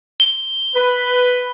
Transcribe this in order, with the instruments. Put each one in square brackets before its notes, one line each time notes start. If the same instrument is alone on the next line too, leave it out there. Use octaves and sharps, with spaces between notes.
[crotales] G7
[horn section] B4